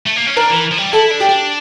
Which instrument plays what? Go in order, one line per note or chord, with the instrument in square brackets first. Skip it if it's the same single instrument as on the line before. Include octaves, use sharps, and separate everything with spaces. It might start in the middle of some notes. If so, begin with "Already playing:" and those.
[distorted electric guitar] A3
A#3
C#4
[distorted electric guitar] D4 [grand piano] A#4
[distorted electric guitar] E3
F3
G3
[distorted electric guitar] E4 [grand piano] A4
[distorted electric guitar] D4
[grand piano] G4
[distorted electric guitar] D4